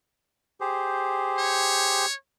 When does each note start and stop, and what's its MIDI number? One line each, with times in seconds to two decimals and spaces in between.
0.61 2.06 67
0.61 2.06 68
0.61 2.06 72
1.38 2.14 73